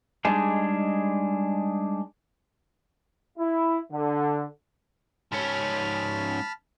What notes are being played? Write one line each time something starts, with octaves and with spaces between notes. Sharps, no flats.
G3 G#3 D4 D#4 G#4
E4
D3
G#2 C#4 A5 B5 F6